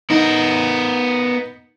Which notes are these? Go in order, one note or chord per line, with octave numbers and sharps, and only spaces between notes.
B3 D#4 A#4